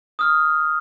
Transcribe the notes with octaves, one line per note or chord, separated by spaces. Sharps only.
D#6 F6